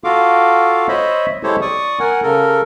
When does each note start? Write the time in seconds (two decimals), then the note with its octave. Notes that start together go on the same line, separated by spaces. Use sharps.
0.04 F4 F#4 A4 F5 D6
0.88 C5 C#5 D#5 E5 B5
1.43 G#3 E4 G4 A4 C5 C#5
1.62 D5 C#6 D#6
1.99 A#4 F#5 G#5
2.23 C#3 A4 A#4